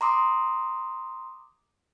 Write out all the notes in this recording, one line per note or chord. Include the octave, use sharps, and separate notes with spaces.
A#5 C6 D6 D#6